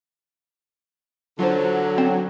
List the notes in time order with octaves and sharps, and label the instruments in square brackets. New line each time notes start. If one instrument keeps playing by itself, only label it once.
[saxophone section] D3 [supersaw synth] F#3 [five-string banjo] F4 C5
[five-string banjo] C4